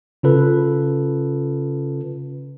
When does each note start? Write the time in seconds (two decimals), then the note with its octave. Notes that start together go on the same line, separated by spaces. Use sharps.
0.23 C#3 C#4 F4 A4 B4